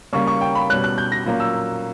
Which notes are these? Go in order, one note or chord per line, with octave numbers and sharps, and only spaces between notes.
C#3 G3 A#3 C#4 C#6
C#6
G5
B5
B2 G3 C#4 F#6
F#6
G6
A#6
A#2 F#3 A#3 C#4
E6